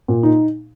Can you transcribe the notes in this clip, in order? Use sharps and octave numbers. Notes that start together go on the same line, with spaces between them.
A#2
D#4